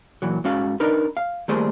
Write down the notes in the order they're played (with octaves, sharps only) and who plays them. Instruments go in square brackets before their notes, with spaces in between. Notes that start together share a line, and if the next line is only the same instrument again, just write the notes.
[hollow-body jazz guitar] A#2 E3 F#3
G#2 C#4 F#4 F5
D4 D#4 A#4 B4
F5
D#3 G3 A3 A#3 G#4 C5